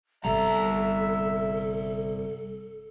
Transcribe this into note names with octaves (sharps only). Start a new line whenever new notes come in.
G1 C2 C3 G3 A4 E5 A#5